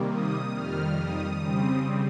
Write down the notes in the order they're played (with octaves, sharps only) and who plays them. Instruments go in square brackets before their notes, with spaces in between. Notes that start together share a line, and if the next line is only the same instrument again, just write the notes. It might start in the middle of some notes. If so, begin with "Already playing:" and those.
Already playing: [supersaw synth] C3 D#3 G3 A#3
D#6
F2 D#3 G3 F6
D#6
C#3 G3 C4